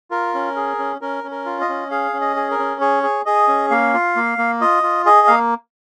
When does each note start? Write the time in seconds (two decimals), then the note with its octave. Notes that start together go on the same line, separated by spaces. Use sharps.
0.11 F4 A#4
0.34 C#4
0.56 G#4
0.79 C#4
1.01 C#4 A#4
1.24 C#4
1.31 A#4
1.46 F4
1.61 D#5
1.69 C#4
1.91 G#4 F5
2.14 C#4
2.21 D#5
2.36 G#4
2.51 A#4
2.59 C#4
2.81 G#4 C#5
3.03 G#4
3.26 G#4 D#5
3.48 C#4
3.70 A#3 F5
3.94 F4
4.16 A#3
4.38 A#3
4.61 F4 D#5
4.83 F4
5.05 G#4 D#5
5.27 A#3 F5